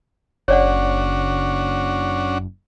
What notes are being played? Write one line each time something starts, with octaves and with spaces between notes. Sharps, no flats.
F#1 C#4 D4 F#4 C#5 D5 F#5